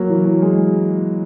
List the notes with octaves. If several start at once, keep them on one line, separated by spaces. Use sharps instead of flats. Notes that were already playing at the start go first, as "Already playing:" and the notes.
Already playing: F#3 A#3
E3
F#3
G#3